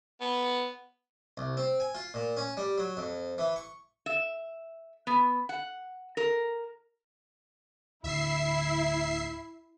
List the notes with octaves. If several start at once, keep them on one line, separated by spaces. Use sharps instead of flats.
B3
C2
C4
G#5
F4
A#2
C#4
G3
F#3
F2
E3
C#6
E5
B3
F#5
A#4
D1 D2 D3 E4 E5 C7